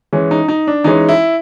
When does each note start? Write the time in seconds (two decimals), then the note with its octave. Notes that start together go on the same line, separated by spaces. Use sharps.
0.13 E3 G#3 C#4
0.31 D#4
0.48 D#4
0.67 D4
0.84 E3 G#3 C#4 D#4
1.09 E4